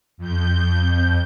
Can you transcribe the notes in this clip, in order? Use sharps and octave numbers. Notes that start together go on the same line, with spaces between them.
F2 G6